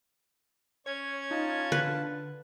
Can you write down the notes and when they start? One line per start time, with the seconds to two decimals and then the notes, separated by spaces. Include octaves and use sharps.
0.86 C#4 C#5 G#6
1.31 D#4 F4 A5
1.72 D3 B4